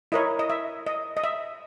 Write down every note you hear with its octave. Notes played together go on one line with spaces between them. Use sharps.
E4 A#4 C#5 D#5
D#5
E5
D#5
D#5
E5